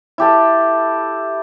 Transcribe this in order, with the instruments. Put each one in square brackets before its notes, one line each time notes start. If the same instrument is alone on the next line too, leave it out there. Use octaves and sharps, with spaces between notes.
[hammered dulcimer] E4 G4 A4